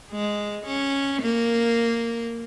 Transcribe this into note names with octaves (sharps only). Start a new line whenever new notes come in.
G#3
C#4
A#3